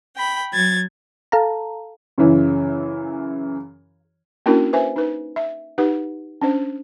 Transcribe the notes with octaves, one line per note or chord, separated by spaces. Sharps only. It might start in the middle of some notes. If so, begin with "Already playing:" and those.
G5 B5
F#3 G#6 A6
A4 F5 A5 A#5
F#2 C#3 E3
A#3 C#4 D4 E4 F#4 A#4
B4 C5 E5 G#5
D#4 B4
E5
D#4 G4 B4 F#5
C#4 D4 C5